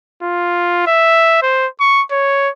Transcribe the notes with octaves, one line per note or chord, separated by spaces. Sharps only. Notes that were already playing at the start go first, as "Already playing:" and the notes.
F4
E5
C5
C#6
C#5